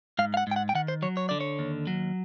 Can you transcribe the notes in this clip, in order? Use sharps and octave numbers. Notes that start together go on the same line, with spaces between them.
G#2 F5
F5
F#5
G#2 G5
F#5
G5
D#3 F#5
C5
F#3 C#5
C#5
D3 D5
C#5
D#2
F#3